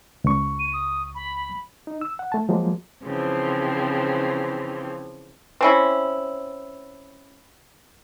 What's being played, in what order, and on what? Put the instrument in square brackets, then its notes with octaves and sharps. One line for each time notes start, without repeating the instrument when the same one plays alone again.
[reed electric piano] C#2 C#6
[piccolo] D#7
D#6
B5
[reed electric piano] D#4
E6
F#5
A3 A5
F3 F#3 G#3 A#3
[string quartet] C#3 E3 F3 C4
[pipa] C4 C#4 E4